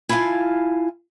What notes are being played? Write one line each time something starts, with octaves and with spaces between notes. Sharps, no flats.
E4 F4 F5 F#5 G#5 A5